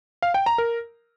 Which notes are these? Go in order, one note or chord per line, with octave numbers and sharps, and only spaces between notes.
F5
G5
A#5
A#4